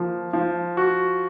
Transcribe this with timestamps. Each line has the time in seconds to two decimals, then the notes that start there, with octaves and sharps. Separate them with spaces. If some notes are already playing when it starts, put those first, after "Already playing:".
Already playing: F3 A#3
0.33 F3
0.77 F#4